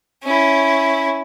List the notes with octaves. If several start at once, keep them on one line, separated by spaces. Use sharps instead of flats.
C#4 E4